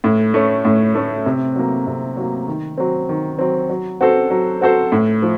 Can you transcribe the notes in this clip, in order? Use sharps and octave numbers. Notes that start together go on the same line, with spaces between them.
A2
A3 C#4
A2
A3 C#4
C3
F#3 A#3
C3
F#3 A#3
D#3
F#3 C4
D#3
F#3 C4
F#3
C4 F#4 A4 C5
F#3
C4 F#4 A4 C5
A2
F3